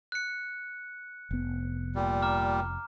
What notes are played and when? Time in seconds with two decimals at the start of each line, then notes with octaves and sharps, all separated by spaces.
0.12 F#6 C#7
1.31 F1 B3
1.96 A#2 G3
2.22 A#5 D6 F6